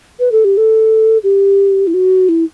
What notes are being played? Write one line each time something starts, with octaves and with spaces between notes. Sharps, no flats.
B4
A4
G4
A4
G4
E4
F#4
E4